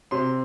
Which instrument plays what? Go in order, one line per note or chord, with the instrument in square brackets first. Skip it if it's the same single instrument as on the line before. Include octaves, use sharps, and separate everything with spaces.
[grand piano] C3 C6